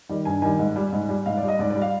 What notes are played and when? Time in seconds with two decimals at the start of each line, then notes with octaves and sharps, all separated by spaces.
0.09 D#3 G3
0.25 G2 G#5
0.42 D#3 G3 G#5
0.59 G#2
0.76 G3
0.92 G#2
1.09 G3
1.26 G#2 F5
1.37 D5
1.43 G3
1.48 D#5
1.59 G#2 D5
1.70 D5
1.75 G3
1.82 F5